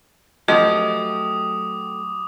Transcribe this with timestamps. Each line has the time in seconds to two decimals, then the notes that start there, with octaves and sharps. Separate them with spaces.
0.48 F3 F#3 A3 G4 D#5 D6 D#6